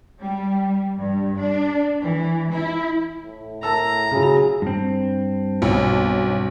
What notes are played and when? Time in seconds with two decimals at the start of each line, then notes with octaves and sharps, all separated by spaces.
0.20 G3
0.98 G2
1.36 D4
2.04 E3
2.52 E4
3.23 A2
3.63 A2 A#4 A5 A#5 E6
4.11 C#3 F#3 G#4
4.62 G2 C4
5.62 B1